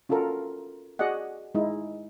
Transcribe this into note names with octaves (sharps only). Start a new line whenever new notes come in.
C#4 F4 F#4 A4 A#4
F#4 G#4 D5 D#5 F#5
G#3 D#4 E4